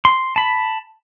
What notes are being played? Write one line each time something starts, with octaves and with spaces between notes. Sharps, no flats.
C6
A5 B5